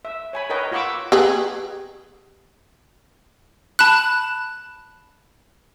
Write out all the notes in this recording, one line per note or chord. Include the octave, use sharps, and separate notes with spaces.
E5
C#5 G#5 B5
A#4 B4 C#5 D#5 G5
F4 F#4 B5 C#6 D6 E6
G4 G#4 B4
A5 B5 F#6